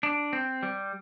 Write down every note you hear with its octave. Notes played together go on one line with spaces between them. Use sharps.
D4
C4
G3